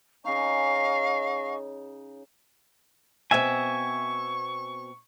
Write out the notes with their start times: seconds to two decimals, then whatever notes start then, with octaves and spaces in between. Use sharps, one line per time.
0.24 C#3 D#4 D#5 F5 G#5 C#6
3.31 B2 C4 E5 G#5 C#6